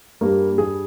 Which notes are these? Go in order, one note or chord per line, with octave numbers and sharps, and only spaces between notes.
G2 G3 A#3
G#4